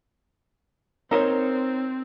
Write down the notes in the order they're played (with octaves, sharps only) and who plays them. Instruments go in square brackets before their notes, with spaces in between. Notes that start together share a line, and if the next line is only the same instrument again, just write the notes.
[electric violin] C4 [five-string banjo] D#4 C5 C#5 [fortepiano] A#4